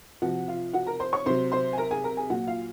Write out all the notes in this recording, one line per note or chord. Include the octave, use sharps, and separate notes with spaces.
C3 F3 F#4 F#5
F4 F5
F#4 F#5
A#4 A#5
C5 C6
C#5 C#6
C3 F#3 C5 C6
C5 C6
G#5
A#4 A#5
G#4 G#5
A#4 A#5
G#4 G#5
A#2 F#3 F#4 F#5
F4 F5